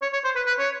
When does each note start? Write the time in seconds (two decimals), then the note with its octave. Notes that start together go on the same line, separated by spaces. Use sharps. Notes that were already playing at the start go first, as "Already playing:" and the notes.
0.02 C#5
0.13 C#5
0.24 C5
0.36 B4
0.46 B4
0.59 C#5